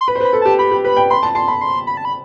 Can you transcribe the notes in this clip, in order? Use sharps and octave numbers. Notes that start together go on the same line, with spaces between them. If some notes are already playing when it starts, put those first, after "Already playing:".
C6
B4 B5
C5
B4
B5
A4
G4 A5
G4 B5
G4
B4 B5
G5
B5 C6
A5
A5 C6
B5
C6
B5
A5
B5